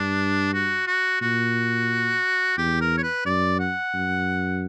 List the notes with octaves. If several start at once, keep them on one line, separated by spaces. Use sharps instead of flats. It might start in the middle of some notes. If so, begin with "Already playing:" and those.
Already playing: G2 D4
F#4
F#4
A#2 F#4
E2 G4
A#4
C#5
B4
F#2 D5
F#5
F#2